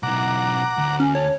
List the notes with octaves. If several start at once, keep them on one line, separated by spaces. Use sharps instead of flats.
B1 E4 F#5 A#5 D6
D2
C#4
A4 C#5